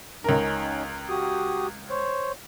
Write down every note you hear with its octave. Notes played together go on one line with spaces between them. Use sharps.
C#2 C#4 D#4 A#4
F#4 G4 D#6
C5 C#5